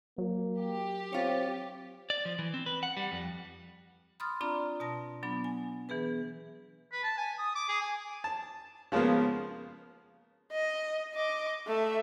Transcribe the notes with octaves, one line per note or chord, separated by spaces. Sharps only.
F#3 A#3
G4
C4 F4 C#5
D5
F3
E3
C4
B4
F#5
G3
F2
B5 C6 D#6 F6 A6
C4 D4 F4 D5 A#5 B5
B2 A5 D#6 A#6
F#3 B3 D4 B5
G#5
E3 B3 G#4 B4
B4
A5
G#5
D#6
D6
G#4
G#5
A5
C#3 F3 G#3 A#3 B3
D#5
D#5 D6
A3 E5